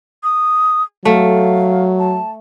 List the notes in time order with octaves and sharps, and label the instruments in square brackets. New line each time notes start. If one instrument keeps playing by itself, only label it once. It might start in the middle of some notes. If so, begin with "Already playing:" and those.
[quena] D#6
[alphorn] F#3 [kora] A3 [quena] F5
[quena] A5